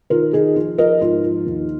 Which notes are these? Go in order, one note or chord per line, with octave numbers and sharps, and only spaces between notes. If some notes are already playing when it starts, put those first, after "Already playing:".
D#3 F4 A#4
D#3 D#4 G#4
F3 F4
F3 A#4 D#5
G#2 F4
F3
D#2